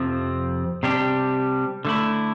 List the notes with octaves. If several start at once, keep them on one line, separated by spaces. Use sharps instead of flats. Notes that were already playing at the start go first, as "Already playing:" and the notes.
Already playing: F2 C3 F3 C4
C3 G3 D4 G4
D3 A3 E4